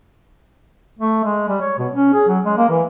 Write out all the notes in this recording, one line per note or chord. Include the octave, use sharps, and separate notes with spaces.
A3
G#3
G3
C#5
B2
C#4
G#4
F#3
G#3
A#3
E3